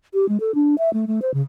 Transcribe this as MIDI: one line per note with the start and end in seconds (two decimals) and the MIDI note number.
0.14 0.28 67
0.29 0.38 56
0.40 0.54 69
0.55 0.75 62
0.78 0.92 76
0.93 1.05 57
1.07 1.20 57
1.22 1.31 72
1.34 1.42 49